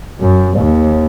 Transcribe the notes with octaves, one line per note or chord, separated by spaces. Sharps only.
F#2
D#2